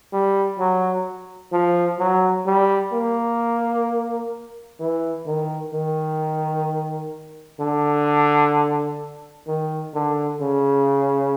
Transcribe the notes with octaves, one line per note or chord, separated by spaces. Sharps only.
G3
F#3
F3
F#3
G3
A#3
E3
D#3
D#3
D3
D#3
D3
C#3